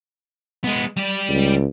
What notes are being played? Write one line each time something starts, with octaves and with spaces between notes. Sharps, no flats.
G#3 B3
G3 D5
C#2